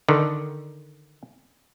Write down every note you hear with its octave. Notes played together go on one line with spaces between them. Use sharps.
D3 D#3